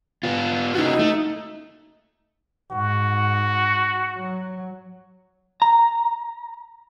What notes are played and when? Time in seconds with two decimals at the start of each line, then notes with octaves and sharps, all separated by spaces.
0.23 B3 F4
0.75 C#4 D#4 E4 F#4
0.99 A3
2.72 G#2 F#4
4.16 F#3
5.62 A#5